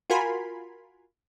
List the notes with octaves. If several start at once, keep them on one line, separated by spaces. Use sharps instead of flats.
F4 F#4 A#4 G#5 B5 C6